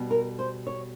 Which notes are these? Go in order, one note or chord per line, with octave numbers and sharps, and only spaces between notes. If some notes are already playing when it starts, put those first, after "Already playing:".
Already playing: B2 G3
A#4
C5
C#5